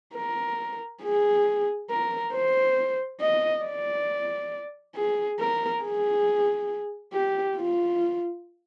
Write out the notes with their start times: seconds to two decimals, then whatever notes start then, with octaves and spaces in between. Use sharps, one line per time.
0.15 A#4
1.03 G#4
1.90 A#4
2.33 C5
3.21 D#5
3.65 D5
4.95 G#4
5.39 A#4
5.83 G#4
7.13 G4
7.57 F4